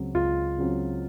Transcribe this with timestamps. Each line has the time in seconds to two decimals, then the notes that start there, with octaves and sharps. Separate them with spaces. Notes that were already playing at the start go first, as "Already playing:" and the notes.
Already playing: C#2 C#3 F#3 C4
0.14 C#2 F4
0.58 C#3 F#3 C4